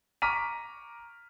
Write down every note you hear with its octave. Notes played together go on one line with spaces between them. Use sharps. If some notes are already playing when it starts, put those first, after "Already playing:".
A#5 C#6 D6 F6 B6 D#7